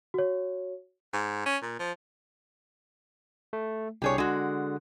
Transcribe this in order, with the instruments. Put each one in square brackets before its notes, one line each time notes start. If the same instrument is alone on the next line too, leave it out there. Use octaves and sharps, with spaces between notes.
[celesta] F#4 C#5
[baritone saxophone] G#2
C#4
A#2
F3
[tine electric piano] A3
[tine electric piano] C2 D4 [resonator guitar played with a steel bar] G4 G#4 C#5
[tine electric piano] D3 [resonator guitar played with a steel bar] G#3 F#4